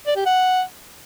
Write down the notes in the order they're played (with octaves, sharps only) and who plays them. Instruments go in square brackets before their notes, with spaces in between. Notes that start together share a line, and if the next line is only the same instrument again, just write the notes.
[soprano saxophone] D5
G4
F#5